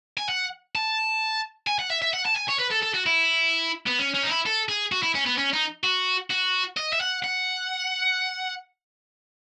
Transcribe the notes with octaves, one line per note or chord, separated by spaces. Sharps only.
G#5
F#5
A5
G#5
F#5
E5
E5
F#5
A5
G#5
C#5
B4
A4
A4
F#4
E4
B3
C#4
C#4
D#4
E4
A4
G#4
F#4
E4
C#4
B3
C#4
D#4
F#4
F#4
D#5
E5
F#5
F#5